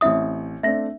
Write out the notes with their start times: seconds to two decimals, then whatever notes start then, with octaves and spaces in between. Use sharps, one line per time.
0.01 A1 C4 E4 E5 D#6
0.63 A3 C4 D4 E5 A#6